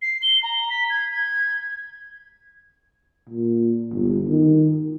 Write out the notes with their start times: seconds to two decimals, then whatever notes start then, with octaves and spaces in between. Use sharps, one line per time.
0.02 C7
0.22 G7
0.43 A#5
0.70 B6
0.90 G#6
1.13 G#6
3.29 A#2
3.92 G1
4.28 D#3